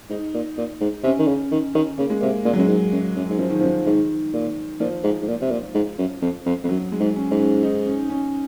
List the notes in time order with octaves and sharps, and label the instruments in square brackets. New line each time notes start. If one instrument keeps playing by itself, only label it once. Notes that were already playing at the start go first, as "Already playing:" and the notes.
[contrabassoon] G#2 [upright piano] D#4
[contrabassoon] A#2
A#2
G#2
[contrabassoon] C3 [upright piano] C#4
[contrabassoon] D#3
C#3
D#3
D#3
[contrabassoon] C#3 [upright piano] A#3
[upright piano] G#3
[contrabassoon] C3 [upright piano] A#3
[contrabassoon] A#2 [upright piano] G#3
[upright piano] F#3
[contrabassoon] F#2 [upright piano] G#3
[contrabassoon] G#2
F#2
F#2
G#2
[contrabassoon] F#2 [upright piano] F3
[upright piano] D#3
[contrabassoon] F#2 [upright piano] F3
[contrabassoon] G#2 [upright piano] D#3
[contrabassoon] A#2
[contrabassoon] A#2 [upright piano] F3
[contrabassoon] G#2
G#2
A#2
C3
A#2
G#2
F#2
F2
F2
F2
[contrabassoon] F#2 [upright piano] F#3
[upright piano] G#3
[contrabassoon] G#2
[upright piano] C#4
[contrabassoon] G#2
[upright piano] C#4
D#4
C#4
C#4